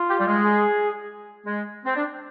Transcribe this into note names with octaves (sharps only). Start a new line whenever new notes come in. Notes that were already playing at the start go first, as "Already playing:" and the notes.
Already playing: F4
G4
G3
G#3
G#4
G#3
C4
D4